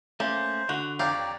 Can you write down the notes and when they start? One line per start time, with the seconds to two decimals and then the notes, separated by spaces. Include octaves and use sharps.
0.20 A3 A#3 C#4 C5
0.69 D3 F#4 F#6
0.99 F2 G4 C#5 D5 F5 A#5